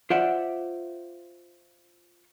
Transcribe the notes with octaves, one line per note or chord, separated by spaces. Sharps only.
F4 C5 D5 E5 F#5